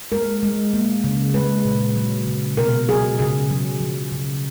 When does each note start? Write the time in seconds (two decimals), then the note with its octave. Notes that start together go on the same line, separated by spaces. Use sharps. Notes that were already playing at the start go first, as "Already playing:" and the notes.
0.12 G#3 A#4
0.43 G#3
0.73 A#3
1.04 C#3
1.34 G#3 B4
1.65 A#2
1.96 F#3
2.27 C#3
2.57 B2 A#4
2.88 F#3 G#4
3.19 C#3 G#4
3.50 F#3
3.80 F3
4.12 C#3